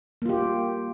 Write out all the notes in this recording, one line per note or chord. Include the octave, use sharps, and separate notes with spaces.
A#3 F4 G4